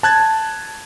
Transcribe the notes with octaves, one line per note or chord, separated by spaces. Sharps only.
A5 F#6 G#6 A6